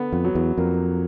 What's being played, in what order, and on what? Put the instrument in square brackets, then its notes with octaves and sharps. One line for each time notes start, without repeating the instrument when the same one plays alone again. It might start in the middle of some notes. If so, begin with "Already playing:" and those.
Already playing: [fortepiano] D3 B3
[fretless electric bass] F2
[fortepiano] F#3
[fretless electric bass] E2
[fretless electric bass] F2 [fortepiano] A#3